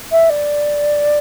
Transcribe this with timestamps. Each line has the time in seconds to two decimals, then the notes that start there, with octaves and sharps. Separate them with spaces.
0.11 E5
0.29 D5